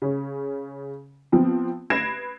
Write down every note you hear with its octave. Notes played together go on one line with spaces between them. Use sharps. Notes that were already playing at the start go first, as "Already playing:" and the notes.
C#3 C#4
F3 B3 C4
B4 G#6 A#6 C7 D7 E7